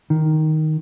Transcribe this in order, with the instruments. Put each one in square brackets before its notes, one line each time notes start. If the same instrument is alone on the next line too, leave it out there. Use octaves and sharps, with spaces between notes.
[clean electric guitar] D#3